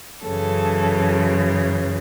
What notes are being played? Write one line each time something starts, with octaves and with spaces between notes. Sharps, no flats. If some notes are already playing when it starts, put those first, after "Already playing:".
F#2 C#3 E3 A4